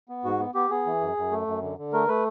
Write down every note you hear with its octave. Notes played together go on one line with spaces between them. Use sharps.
B3
G#2 F#4
B3
B3 G4
B3 G#4
E3
F#2
F#2
A3
F#2
D3
D3
A3 A#4
A3 B4